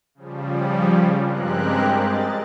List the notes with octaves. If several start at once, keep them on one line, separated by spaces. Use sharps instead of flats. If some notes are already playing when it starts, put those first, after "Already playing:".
C#3 F3 G3
G2 G#3 C4 G4 A#4 F#6
D#5 A6